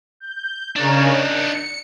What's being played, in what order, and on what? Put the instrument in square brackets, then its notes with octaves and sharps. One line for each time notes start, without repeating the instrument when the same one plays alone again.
[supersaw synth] G6
[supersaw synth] C#3 A#4 C#5 [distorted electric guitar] D4 D#4
[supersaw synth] C#7